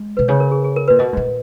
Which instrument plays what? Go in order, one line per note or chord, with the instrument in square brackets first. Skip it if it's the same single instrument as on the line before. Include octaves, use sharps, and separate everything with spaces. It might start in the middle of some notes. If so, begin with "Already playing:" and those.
Already playing: [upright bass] G#3
[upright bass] B2 [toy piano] B4
[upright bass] C#3 [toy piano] C#5
[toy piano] A#4
G#4
G#4
A#4
[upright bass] A#2 [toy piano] B4
[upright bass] B2 [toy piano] D#5
[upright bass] G#2
A#2